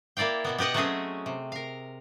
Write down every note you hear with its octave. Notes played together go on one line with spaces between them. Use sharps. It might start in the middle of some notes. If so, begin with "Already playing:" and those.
A#3 E4 D5 F5 G5
B2 A#3 B3
B3 G4 B4 D#5 F#5
F#3 A3 C4 C#4 G#4 D#5
C3
A#4 F5